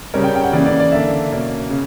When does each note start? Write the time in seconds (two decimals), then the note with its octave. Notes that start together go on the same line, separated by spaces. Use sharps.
0.14 C#3 G3 C#4 A#4
0.24 G5
0.35 G5
0.44 F#5
0.53 C#3 E3 A#3 D5
0.66 D5
0.80 D5
0.92 D3 A#3 D4 E5
1.32 B2 A#3 C#4
1.70 C#3